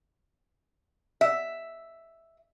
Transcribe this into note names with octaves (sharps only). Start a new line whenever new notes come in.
E5